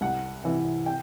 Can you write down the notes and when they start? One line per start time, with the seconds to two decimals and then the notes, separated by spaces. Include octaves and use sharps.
0.01 C2 F#5
0.44 C3 E3
0.86 G5